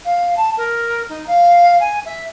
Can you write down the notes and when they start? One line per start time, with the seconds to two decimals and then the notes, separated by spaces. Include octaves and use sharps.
0.05 F5
0.37 A5
0.57 A#4
1.09 D#4
1.27 F5
1.80 G#5
2.05 E5